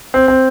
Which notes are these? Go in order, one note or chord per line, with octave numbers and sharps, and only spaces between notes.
C4
C4